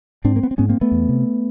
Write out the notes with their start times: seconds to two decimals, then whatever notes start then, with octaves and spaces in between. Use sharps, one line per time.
0.24 G#2 C4 D4
0.36 A#3
0.43 B3
0.51 C4
0.58 G#2 B3 C#4
0.69 A#3 C4
0.81 A3 B3
0.92 E2
1.09 C3